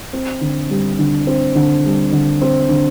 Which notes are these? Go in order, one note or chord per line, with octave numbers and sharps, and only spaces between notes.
C4
D3
G3
D3
C4
D3
G3
D3
C4
D3